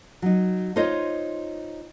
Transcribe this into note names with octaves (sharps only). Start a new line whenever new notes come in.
F#3 D#4
D#4 F4 C5 C#5 D#5